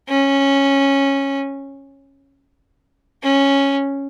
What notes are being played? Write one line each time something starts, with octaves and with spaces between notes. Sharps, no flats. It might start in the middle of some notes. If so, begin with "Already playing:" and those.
C#4
C#4